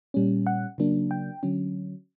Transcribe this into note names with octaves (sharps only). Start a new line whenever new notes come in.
A#2 G3 C#4
F#5
C#3 F#3 A#3 D4
G5
D3 F#3 C#4